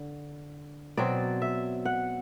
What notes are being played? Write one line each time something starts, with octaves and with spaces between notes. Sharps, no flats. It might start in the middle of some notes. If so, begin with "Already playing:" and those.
Already playing: D3
B2 F#3 C4 D5
E5
F#5